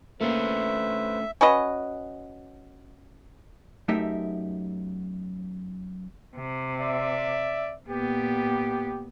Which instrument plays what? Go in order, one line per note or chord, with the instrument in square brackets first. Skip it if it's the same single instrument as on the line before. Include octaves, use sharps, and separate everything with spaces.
[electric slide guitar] A3 C#4 D4 [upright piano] A#3 [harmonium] B4 C5 [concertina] E5
[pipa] C#4 F#4 B4 D#5
[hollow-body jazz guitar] F#2 A3 D#4 G4 A#4 E5
[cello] C3
[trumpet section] D5 E5
[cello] A#2 B3 [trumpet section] G4